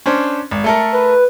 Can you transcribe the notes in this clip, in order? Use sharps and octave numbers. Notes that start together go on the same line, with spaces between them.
C#4 D4 C5
G#1
A3 A4 A#4
B4